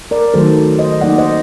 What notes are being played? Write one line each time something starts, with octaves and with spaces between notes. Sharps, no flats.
A#4 D5
D#3 F#3 A3 D#4 A4 C5
C5 D#5
F#3 A#3 D#4 D5 F#5
C5 D#5